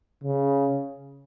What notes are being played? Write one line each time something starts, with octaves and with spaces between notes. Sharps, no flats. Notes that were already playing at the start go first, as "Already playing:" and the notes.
C#3